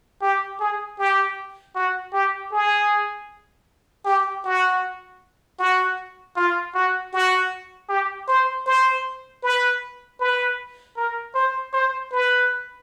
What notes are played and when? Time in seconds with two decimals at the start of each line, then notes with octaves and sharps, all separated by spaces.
0.22 G4
0.60 G#4
0.99 G4
1.75 F#4
2.13 G4
2.52 G#4
4.06 G4
4.44 F#4
5.59 F#4
6.36 F4
6.74 F#4
7.13 F#4
7.89 G4
8.28 C5
8.66 C5
9.43 B4
10.20 B4
10.97 A#4
11.35 C5
11.73 C5
12.12 B4